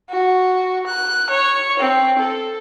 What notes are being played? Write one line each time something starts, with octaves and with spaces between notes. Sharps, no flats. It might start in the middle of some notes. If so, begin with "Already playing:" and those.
F#4
F#6
C#5
C4
A4